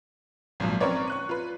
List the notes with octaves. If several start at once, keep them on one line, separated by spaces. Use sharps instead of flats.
G#1 A#2 F3 F#3
C4 C#4 A#4 B4 C#5 D5
C#6 F#6 D#7
F4 B4